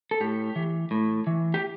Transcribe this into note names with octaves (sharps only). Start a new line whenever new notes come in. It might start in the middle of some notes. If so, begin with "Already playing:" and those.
A4
A2 G4
E3
A2
E3
G4